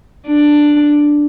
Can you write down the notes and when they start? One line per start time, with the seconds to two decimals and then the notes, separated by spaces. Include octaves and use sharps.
0.27 D4